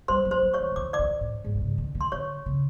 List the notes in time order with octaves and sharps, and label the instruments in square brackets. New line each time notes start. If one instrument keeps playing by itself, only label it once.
[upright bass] G3 [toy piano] C5 C6
[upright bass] F#3
[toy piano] C5 C6
[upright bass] F#3
[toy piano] C#5 C#6
[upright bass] E3
E3
[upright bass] D#3 [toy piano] D6
[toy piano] D5 D6
[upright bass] D#3
A2
G#2
C3
C#3
D#3
D#3
[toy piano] C6
[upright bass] D3 [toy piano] C#5 C#6
[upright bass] C#3